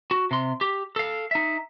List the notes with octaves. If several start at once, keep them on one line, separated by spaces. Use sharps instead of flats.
F#4
C3 C6
G4
A4 F5
D#4 E5